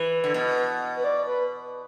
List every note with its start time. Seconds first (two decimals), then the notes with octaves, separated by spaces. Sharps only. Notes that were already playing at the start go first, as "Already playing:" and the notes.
Already playing: E3 B4
0.24 D3
0.34 B2
0.96 B4
1.04 D5
1.27 B4